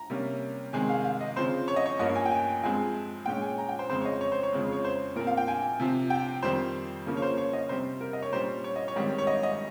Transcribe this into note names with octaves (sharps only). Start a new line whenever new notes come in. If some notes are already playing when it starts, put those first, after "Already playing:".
Already playing: A#5
C3 G3 A#3 C#4
C3 D#3 G#3 C4 G#5
F5
F5
D#5
C#3 F3 C4 C5
C#5
D#5
C#5
G2 F3 A#3 C#4 D#5
G#5
G5
G#5
G2 F3 G#3 C4 G#5
A#2 G#3 C#4 G5
G#5
A#5
G5
C5
F2 C#3 G#3 C4 C5
C#5
D#5
C#5
C5
C#5
F2 C#3 G#3 C4
C#5
C5
A#2 F3 C4 A#4
F5
G5
G#5
C3 F3 C4
G5
F2 D#3 G3 C4 C5
C#3 F3 A#3 C#4
C#5
C5
C#5
D#5
C3 G3 C4 C5
A#4
D#5
C#5
A#2 G3 C#4 C5
C#5
D#5
C#5
G#2 D#3 G3 C4
C#5
D#5
D#5